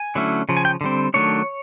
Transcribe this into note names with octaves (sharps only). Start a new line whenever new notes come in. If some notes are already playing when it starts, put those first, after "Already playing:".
Already playing: G#5
D3 F#3 A3 C#4 E4
C#3 F3
G#5
G5
D3 G3 C4
D#3 F#3 A3 D4 C#5